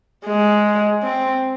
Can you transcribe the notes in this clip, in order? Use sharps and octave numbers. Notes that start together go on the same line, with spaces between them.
G#3
C4